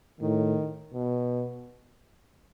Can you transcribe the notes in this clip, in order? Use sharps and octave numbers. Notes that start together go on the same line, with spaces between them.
A2 D#3
B2